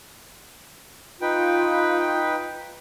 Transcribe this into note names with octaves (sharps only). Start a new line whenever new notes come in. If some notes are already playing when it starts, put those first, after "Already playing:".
D#4 F4 B4 G5